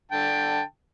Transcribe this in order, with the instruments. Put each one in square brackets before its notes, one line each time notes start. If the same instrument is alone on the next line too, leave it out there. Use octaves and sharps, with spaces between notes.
[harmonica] D3 G5 A5